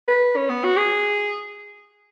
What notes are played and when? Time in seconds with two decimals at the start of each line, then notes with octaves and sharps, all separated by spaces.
0.08 B4
0.36 C#4
0.50 B3
0.64 F#4
0.77 G#4